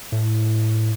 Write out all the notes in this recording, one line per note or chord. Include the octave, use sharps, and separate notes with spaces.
A2